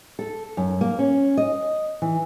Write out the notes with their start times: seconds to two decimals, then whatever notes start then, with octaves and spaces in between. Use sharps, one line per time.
0.19 A4
0.57 F#2
0.81 A#3
0.99 C#4
1.37 D#5
2.02 E3